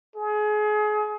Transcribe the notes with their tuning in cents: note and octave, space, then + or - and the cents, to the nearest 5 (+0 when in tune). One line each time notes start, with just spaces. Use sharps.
G#4 +30